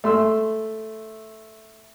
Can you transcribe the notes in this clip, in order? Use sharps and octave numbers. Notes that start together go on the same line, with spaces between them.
A3 C6 E6